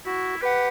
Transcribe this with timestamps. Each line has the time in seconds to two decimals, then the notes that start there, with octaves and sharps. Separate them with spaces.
0.06 E4 F#4
0.41 G4 B4 F#5